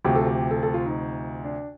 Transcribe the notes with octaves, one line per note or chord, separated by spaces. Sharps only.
D2 C3 F3 G4
A4
G4
A4
A4
F4
D#4
D4